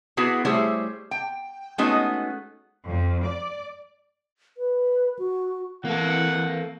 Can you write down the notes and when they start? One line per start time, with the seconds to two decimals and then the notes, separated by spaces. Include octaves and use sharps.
0.17 B3 E4 F#4 G#4
0.45 G3 A3 E4 G#4 C5 C#5
1.11 G5
1.78 G#3 A3 B3 C#4 D#4 F#4
2.87 F2
3.25 D5
4.57 B4
5.19 F#4
5.85 E3 A#3 A4 F#5